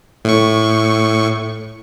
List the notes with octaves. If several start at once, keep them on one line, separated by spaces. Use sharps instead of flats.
A2 C#6